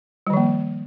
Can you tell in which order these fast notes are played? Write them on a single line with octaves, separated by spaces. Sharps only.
G3 D#3 F3 A#3